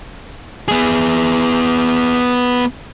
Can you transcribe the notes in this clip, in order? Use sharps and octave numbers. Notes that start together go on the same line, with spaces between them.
B3 G#4